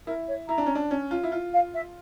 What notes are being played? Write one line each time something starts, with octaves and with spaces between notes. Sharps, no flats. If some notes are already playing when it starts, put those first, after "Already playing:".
E4 A#4
C#5
E4 A#5
D4
C#4
D4
C#4
F4
E4
F4
F5
E5